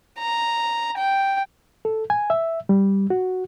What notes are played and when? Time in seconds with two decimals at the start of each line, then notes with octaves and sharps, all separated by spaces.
0.19 A#5
0.98 G5
1.85 A4
2.10 G#5
2.30 E5
2.69 G3
3.10 F#4